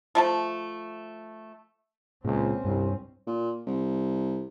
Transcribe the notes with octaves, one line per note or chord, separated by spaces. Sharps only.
F3 A3 A5
C#2 A#2 C4 C#4
C2 G2
A#2
C2